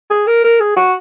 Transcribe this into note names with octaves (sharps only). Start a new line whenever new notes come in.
G#4
A#4
A#4
G#4
F#4